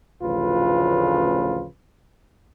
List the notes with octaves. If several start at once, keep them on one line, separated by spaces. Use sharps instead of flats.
A1 D2 C#3 F3 F4 B4